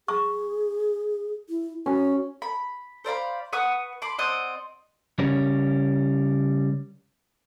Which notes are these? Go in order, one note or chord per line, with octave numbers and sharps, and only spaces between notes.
G#4 C#6
E4
C#4 F#4
B5
C5 D5 F5 B5
B4 F#5 C#6 D#6
B5 C6 D6
C4 D5 D#5 F#5
C#3 G3 C#4 A#4 C#5